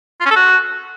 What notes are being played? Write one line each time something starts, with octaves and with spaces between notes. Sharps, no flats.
F4
C#4
A4
F#4